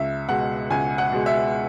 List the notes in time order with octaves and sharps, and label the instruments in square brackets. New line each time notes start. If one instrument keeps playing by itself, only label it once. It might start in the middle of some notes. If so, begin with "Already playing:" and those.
Already playing: [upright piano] C#2 E5
B2 G#3 F#5
C#2 G#5
F#5
B2 G#3
E5